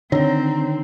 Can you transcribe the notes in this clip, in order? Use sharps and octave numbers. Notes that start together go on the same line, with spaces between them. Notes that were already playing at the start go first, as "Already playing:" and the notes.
D3 D#3 C4 C#5 A#5